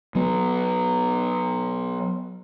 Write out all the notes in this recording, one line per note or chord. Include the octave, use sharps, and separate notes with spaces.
F#3 B3